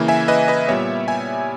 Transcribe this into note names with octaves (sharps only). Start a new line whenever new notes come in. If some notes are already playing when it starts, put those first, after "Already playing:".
Already playing: C#3 E3 A#3 E4
E5 G#5
B4 D#5
B4 D#5
A#2 G3 B3 C#5 E5
E5 G#5